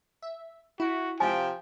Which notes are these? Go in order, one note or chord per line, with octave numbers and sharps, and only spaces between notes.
E5
E4 F#4
C3 F3 F5 G5 G#5